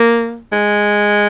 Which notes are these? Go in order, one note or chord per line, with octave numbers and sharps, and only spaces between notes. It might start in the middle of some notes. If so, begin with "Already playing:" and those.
Already playing: A#3
G#3